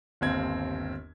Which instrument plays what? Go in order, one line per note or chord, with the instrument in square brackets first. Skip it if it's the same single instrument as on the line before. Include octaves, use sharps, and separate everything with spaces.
[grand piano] G1 D#2 C4 G#6